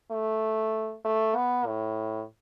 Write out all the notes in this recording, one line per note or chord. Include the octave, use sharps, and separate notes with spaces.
A3
A3
B3
A2